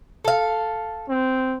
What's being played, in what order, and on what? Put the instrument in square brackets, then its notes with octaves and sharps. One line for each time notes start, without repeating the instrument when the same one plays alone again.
[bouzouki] A4 F5
[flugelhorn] C4